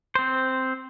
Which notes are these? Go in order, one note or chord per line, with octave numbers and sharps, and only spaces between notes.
C4 C5